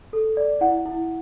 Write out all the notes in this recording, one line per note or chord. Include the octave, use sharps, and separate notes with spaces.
A4
D5
E4 F#5
E4